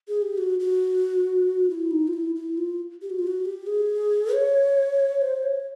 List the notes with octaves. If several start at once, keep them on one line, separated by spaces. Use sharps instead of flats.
G#4
G4
F#4
F#4
E4
D#4
F4
E4
E4
F4
G4
F#4
F4
F#4
G4
G#4
C#5
C5
C#5